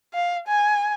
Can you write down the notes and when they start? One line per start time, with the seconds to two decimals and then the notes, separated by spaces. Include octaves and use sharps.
0.14 F5
0.48 G#5